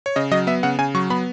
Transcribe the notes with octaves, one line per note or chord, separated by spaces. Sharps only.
C#5
C#3 D#5
F#3 D#5
B3 E5
C#3 F#5
C#3 G#5
F#3 C#6
B3 B5